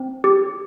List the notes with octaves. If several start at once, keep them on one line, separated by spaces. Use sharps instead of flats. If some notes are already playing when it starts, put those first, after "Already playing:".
Already playing: C4
G4